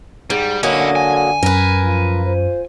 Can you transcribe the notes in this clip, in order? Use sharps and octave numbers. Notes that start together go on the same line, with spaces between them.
G#2 G3
D3 F#3 A#3 C#4 E4 D#5
G#5
F#2 A#4 B4
F3
F4 C5